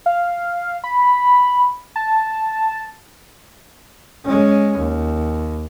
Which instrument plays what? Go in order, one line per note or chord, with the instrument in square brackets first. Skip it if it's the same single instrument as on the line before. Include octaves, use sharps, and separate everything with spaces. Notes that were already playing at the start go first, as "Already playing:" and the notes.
[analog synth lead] F5
B5
A5
[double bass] G#3 C#4
D#2